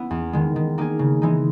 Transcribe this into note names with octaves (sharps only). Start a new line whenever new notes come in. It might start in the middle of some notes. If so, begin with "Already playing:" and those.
Already playing: B3 C#4 E4
E2
D#3 G#3
D#3
A#3 D#4 G#4
C#3
E3 G#3 D#4